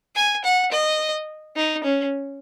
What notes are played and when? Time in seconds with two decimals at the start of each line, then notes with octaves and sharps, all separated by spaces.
0.16 G#5
0.44 F#5
0.72 D#5
1.56 D#4
1.84 C#4